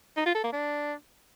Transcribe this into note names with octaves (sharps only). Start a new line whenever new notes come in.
D#4
F4
A4
A#3
D4